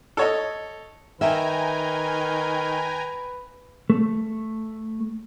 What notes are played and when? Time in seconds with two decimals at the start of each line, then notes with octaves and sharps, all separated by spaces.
0.17 A4 C#5 D#5
1.21 D#3 B4 E5 G5 G#5 A#5
3.90 A3